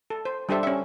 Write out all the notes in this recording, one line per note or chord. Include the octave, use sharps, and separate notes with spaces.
A4
C5
G3 D4 G4 A4 C5 E5
C#4 E5